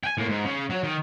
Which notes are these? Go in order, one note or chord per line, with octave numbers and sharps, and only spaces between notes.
G5 G#5
A2 A#3
G#2
C#3
F#3
D#3